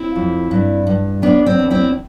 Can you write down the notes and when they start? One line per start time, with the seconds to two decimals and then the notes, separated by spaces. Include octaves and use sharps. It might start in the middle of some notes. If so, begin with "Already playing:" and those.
Already playing: C4 E4
0.16 F2
0.51 G2
0.87 G2
1.22 E2 B3 D4
1.46 C4
1.59 E2
1.70 C4 E4